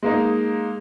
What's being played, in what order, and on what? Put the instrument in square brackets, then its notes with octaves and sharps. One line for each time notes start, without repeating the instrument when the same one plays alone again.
[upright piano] G#3 A#3 D#4